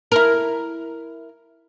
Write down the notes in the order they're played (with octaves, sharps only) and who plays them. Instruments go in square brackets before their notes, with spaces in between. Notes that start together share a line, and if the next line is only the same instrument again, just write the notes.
[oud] E4 A#4